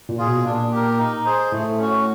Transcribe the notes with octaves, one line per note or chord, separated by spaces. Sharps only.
A#2
F4 G#4
B2
A#2 D4
G4 A#4
D#4
G#4 C5
A2 A3
C#4 F#4